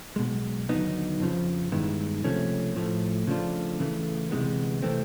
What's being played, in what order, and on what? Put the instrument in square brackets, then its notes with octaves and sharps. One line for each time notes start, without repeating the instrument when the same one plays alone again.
[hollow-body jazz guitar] B1 B2 G#3
D#2 D3 F#3 B3 D#4
F2 C#3 F3
G2 D#3 G#3 B3 E4
C#2 C3 F3 A3 C#4
A2 F3 A3
C#3 F3 A3 D4 F4
C#3 E3 A3
D2 C3 E3 G#3 B3
C3 E3 A3 C4